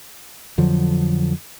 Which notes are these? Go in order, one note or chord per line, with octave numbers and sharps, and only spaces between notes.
F2 D3 F3 F#3